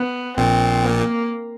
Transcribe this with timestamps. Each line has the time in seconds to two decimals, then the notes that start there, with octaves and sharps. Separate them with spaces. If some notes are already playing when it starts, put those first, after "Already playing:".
Already playing: B3
0.37 A#1 A#2 C4
0.85 A#3